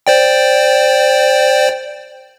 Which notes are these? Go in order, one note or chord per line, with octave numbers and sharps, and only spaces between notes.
C5 D5 G5